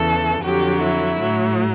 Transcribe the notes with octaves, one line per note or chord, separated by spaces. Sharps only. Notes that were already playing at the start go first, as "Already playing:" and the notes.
Already playing: E2 C#3 E3 A4
F2 D3 F#3 G4
E4
A2 F#3